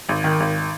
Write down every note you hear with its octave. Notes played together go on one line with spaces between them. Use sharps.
G#1
D#3
G#1